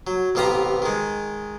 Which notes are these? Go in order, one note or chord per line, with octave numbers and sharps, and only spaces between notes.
F#3
A1 C3 B3 F5 G5 A#5
D#3 G#3